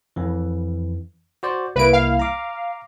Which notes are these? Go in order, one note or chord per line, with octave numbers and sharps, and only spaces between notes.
F2 E3
F#4 C5 D5
C2 A#3 E4 B4 D7
F5
A#5 D6